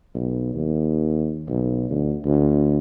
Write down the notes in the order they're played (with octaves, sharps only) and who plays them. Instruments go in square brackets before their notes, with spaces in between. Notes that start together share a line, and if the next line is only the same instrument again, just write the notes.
[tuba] B1
D#2
B1
D2
D2